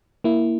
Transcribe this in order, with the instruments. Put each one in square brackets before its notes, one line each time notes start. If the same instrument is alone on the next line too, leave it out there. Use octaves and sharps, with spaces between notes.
[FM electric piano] A#3 E4